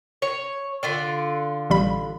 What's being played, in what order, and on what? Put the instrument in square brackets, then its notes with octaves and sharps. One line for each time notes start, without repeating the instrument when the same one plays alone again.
[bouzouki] C#5
D3 F4 D5
[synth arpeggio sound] A1 G3 B5